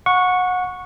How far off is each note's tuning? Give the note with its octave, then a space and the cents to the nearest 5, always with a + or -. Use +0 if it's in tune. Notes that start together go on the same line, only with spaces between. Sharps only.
F#5 -25 C#6 +0